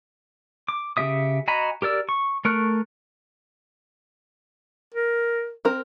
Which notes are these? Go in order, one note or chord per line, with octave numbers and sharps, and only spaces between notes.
D6
C#3 D4 G4 E5 D#6
F#4 D#5 G#5 A#5 B5
G4 A#4 D5 E6
C#6
A3 A#4 C#6 F6 F#6
A#4
C4 A#4